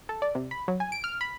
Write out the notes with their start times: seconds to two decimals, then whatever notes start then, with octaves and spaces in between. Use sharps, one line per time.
0.09 A4
0.22 D5
0.35 C3
0.51 B5
0.68 F#3
0.80 G#5
0.92 D7
1.04 F6
1.21 B5